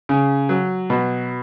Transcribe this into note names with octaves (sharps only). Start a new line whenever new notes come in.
C#3
F#3
B2